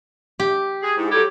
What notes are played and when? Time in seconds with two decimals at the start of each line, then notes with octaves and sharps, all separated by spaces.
0.40 G4
0.83 G#4
0.97 G#2 E4 G#4
1.12 F#3 G3 G4 A4 G#6